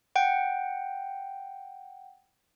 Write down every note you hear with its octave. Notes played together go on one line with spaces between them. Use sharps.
F#5 G5